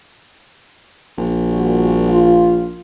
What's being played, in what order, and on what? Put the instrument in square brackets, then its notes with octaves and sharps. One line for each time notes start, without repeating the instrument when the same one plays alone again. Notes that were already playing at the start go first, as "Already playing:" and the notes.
[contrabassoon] A#1
[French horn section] A#2 G3 F#4
F4